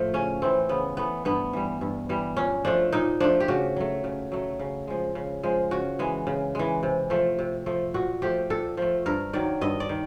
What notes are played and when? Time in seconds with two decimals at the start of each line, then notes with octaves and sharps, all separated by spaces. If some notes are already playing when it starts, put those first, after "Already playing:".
Already playing: A2 F3 A3
0.14 C#3 C#4
0.42 E3 A3 C4
0.69 C#3 B3
0.97 E3 A3 B3
1.25 G2 B3
1.53 E3 G3
1.81 G2
2.09 E3 G3
2.37 A#2 C#4
2.65 F3 A3 D4
2.92 A#2 D#4
3.20 F3 A3 D4
3.40 G4
3.48 C#3 F#4
3.76 F#3 A3
4.04 C#3
4.32 F#3 A3
4.59 C#3
4.87 F3 G#3
5.15 C#3
5.43 F3 G#3
5.71 C#3 F#4
5.99 E3 G#3
6.27 C#3
6.55 E3 G#3
6.83 C3
7.10 F3 A3
7.39 C3
7.66 F3 A3
7.94 A#2 F#4
8.22 F3 A3 G4
8.50 A#2 A4
8.77 F3 A3
9.06 G2 A#4
9.33 D#3 F#3 D5
9.61 G2 D#5
9.80 D5
9.89 D#3